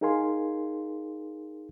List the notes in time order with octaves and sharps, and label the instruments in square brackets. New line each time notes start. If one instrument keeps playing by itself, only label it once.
[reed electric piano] D#4 G#4 A#4 F5 G#5 C6